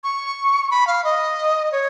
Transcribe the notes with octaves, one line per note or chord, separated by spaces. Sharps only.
C#6
B5
F5
D#5
C#5